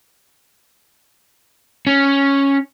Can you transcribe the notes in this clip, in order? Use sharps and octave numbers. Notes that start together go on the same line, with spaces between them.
C#4